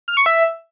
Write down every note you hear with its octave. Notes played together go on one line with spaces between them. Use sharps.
F6
C#6
E5